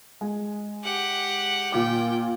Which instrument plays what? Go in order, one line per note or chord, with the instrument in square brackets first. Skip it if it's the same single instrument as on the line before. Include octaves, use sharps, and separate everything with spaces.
[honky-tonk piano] G#3
[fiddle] G4 F#5
[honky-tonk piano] A#2 F4 D6 [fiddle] G5